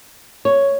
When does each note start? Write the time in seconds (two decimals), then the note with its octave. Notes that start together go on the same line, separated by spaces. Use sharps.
0.45 C#5